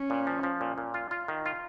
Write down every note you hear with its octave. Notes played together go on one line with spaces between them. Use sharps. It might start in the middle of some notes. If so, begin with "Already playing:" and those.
Already playing: C#4
A#2
F3
F3
A#2
A#2
F4
F4
D#3
F4